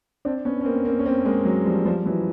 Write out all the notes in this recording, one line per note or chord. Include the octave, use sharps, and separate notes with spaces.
C4 D4
B3 C#4
C#4
A#3 C4
A#3 C4
C#4
A#3 C4
G#3 A#3
F#3 G#3
F3 G3
F3 G3
E3 F#3